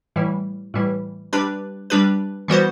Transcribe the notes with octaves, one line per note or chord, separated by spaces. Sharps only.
A2 E3 G3
A2 E3 G3
G3 D4 G4 B4
G3 D4 G4 B4
E3 G3 B3 F#4 C5